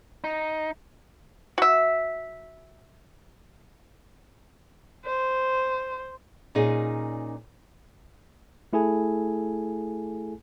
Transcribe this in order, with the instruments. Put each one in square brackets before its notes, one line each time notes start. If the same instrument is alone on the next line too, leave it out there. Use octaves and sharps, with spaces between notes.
[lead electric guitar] D#4
[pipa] F#4 E5
[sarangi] C5
[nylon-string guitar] A#2 C#4 D#4 G#4
[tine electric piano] A3 E4 G#4 A4 G#5